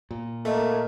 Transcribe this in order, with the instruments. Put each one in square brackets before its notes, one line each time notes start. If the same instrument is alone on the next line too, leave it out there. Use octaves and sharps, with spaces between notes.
[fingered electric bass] A#2
[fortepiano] A3 [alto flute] A#3 [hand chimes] A#4 D#5